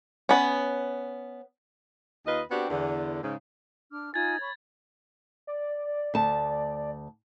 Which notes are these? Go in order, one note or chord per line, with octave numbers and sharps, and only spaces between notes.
B3 C#4
D#2 F4 B4 D#5
B3 C4 D4 F#4 G4
E2 D3
G#2 C#3
D4 D6 F6
D#4 F4 G#5 G#6 A6
C#5 B5 C#6
D5
D2 A5